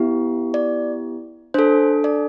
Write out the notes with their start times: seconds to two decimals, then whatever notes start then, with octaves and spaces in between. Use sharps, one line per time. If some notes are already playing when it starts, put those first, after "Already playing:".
Already playing: B3 E4 G4
0.54 D5
1.54 D4 A4 C5
2.04 D5